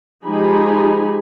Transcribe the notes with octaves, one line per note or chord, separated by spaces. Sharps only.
F3 G#3 D#4 G4 G#5 B5